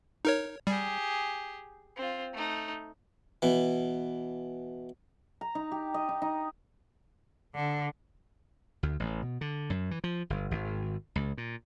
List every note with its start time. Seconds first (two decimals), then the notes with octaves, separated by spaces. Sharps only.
0.25 D#4 A#4 C#5
0.67 G3 G4 G#4
1.97 C4 F4
2.34 A3 D#4
3.42 B2 E3
5.41 A#5
5.55 D#4
5.72 G4
5.94 D#5
6.09 D#4
6.22 D#4
7.55 D3
8.83 D2
9.00 A1
9.23 B2
9.41 D3
9.70 F#2
9.91 E3
10.04 F3
10.30 G1
10.51 G#1
11.16 C#2
11.38 A#2